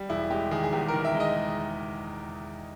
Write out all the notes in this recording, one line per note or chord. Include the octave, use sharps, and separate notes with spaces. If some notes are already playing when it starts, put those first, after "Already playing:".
Already playing: G3
E1 E4
G#3 G4
D#3 G#4
G#4
E2 G4
A#4
D#3
E5
G#3
D#5